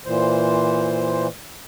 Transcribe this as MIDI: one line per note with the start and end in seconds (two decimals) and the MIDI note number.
0.06 1.27 46
0.06 1.27 52
0.06 1.27 72